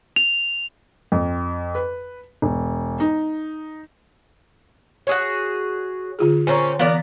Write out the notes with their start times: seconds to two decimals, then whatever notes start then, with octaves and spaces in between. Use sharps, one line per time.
0.16 F7
1.12 F2
1.75 B4
2.42 E1
3.00 D#4
5.07 F#4 G#4 C#5
6.19 D3 F4 G#4
6.47 A#2 C4 C#4 G#5 A#5
6.79 E3 B3 A#4 D5 F5